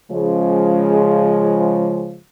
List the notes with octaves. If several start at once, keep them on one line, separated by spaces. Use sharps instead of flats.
C#3 F3 G#3